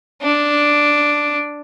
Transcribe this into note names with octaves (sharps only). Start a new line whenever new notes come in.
D4